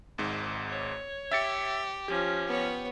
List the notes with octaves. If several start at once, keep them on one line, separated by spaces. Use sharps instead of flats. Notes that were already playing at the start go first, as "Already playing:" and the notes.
G#1 G#2
C#5
G4 E5 A6 C#7
F3 C#4 G4
B3 C#5